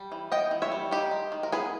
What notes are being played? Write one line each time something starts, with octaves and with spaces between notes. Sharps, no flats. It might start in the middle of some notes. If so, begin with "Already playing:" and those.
Already playing: G3
E3
B3 D#5 G5
E3
C#5 E5
G3
D#3 G4
G#3
D#3
A#4
B3 G#4 B4